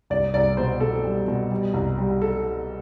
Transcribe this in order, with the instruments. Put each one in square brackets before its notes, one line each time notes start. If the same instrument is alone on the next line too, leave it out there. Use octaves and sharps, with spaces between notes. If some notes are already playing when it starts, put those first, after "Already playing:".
[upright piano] C2 D5
C2 D5
B2 C5
B2 A4
G3
B2
G3
C2
G3
A4